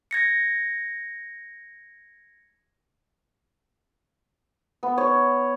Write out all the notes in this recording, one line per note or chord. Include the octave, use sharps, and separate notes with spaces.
G#6 A#6 C#7
B3
C#5